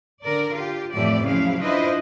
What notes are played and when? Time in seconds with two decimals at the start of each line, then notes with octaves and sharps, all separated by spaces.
0.22 D3 A#4 D5
0.55 F4 G4
0.93 F2 A2 E3 F3 G4 D5
1.26 C#3 F3 F#3 E4 F5
1.61 D4 E4 F4 B4 C5 D#5